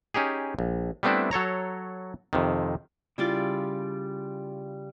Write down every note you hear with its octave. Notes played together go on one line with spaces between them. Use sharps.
C#4 D#4 G4 G#4
A#1
G3 A3 B3 C4 D4 E4
F#3 A4 C#5 A#5
F2 C3 D#3
C#3 G3 E4 F4 D5